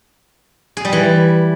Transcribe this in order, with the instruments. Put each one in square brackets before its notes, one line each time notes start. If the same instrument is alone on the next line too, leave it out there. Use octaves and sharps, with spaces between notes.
[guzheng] G#4
G3
E3